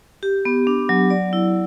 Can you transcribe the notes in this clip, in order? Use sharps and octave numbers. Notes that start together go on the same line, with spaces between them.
G4
B3
D4
F#3
D5
E4